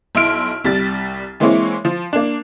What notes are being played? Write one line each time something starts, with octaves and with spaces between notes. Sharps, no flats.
B1 E4 C6 E6 F6 D7
C2 G3 A6
E3 G#3 A#3 C4 E4 C#5
F3
A#3 D4